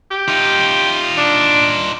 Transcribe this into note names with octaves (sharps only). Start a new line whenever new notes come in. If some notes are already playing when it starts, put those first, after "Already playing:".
G4
D#4 F4
D4